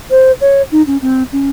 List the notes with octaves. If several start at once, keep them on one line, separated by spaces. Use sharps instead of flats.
C5
C#5
D#4
C#4
C4
C#4